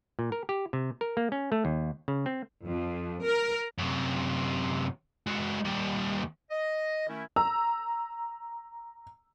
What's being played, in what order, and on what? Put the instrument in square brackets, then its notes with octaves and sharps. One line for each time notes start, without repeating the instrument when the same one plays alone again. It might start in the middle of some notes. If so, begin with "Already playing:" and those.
[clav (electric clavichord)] A#2
A#4
G4
C3
A#4
A#3
C#4
A3
D#2
C#3
C4
[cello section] F2
A#4
[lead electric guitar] F#2 C3
G#3 F#4
D#2 G3
[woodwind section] D#5
D#3 A3 C#4 E4
[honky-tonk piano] A#5 E6